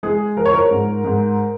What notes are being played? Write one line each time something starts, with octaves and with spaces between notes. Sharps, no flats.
G#3 G#4
F3 A#4
C#5
A#4
G#2
G#2